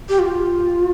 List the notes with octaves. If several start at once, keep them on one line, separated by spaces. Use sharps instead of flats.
G4
F4